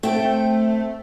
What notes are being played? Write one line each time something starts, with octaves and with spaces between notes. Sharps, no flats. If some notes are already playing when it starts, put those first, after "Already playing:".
A3 C4 G5